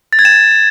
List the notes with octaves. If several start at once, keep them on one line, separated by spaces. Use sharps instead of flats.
A6
G#6
E7